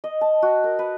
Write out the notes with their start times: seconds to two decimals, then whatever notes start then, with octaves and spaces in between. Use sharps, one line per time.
0.04 D#5
0.21 A5
0.42 F#4
0.64 A#4
0.79 B4